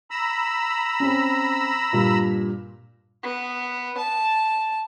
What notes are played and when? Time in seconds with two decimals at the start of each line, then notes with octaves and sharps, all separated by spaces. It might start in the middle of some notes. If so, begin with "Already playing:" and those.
0.11 A#5 B5 E6
1.00 C4 C#4
1.93 G2 A#2
3.23 B3
3.98 A5